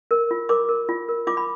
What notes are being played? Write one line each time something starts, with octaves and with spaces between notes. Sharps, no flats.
A#4
F4
A#4 D6
A#4
F4
A#4
F4 D6
B5